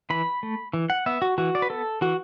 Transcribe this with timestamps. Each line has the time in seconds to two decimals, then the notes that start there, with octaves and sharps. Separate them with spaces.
0.10 E3 B5
0.43 A3
0.73 E3
0.90 F#5
1.06 B3 E5
1.22 F#4
1.38 E3 F#4
1.55 D5
1.62 B4
1.70 B3 A4
2.01 E3 F#4